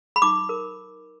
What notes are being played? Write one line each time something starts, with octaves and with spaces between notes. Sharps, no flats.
B5
D#4 D6
A#4